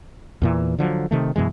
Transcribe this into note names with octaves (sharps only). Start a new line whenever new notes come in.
E2 A#2 E3
D3 F3 F#3
C3 D#3 A3
F#2 B2 E3 G#3